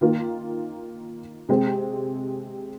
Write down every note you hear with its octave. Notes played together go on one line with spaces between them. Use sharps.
D#3 A#3 F4 A#4
C3 G#3 C4